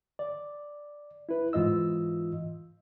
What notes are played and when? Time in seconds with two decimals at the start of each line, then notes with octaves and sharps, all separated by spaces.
0.19 D5
1.29 E4 B4
1.53 G#2 E3 F4 D#5 E6